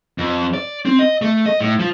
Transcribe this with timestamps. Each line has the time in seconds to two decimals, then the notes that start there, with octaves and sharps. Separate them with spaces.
0.18 F2
0.54 D5
0.86 C4
0.99 D#5
1.22 A3
1.46 D#5
1.60 A2
1.79 F3